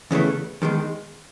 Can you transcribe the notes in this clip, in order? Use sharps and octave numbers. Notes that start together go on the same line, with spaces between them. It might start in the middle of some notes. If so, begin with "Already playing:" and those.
E2 C#3 E3 A3
E2 D#3 G#3